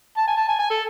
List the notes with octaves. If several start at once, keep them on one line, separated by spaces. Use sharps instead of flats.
A5
G#5
A5
G#5
G#5
A4